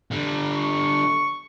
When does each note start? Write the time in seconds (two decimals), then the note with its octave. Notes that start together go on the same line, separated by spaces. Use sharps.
0.11 D3 G3
0.53 C#6